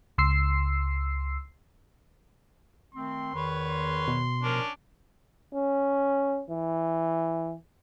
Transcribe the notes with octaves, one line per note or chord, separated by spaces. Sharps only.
C#2 C6 E6 C7
D#3 A3 C4 C6
E2 D#3 B4 C#5
C6
B2
A#2 F3 C#4 D4 A#4
C#4
E3